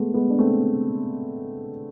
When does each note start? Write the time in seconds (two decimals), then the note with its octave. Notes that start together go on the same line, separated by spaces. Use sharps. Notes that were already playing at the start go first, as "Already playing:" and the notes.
Already playing: G#3 A3 B3
0.14 G#3 B3
0.30 D4
0.39 A3 C4